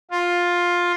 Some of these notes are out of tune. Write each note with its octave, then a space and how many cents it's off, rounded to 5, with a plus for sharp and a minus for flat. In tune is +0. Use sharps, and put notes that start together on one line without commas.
F4 +10